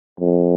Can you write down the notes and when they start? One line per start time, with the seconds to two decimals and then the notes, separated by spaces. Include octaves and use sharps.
0.20 F2